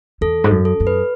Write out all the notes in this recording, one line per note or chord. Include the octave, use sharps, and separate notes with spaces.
E2 A4
G#2
F#2
A4
F#2
B4